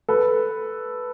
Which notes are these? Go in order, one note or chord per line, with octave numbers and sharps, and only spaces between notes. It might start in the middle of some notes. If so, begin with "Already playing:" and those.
A4 B4